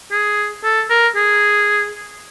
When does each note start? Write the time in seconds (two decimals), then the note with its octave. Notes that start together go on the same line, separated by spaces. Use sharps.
0.11 G#4
0.63 A4
0.90 A#4
1.15 G#4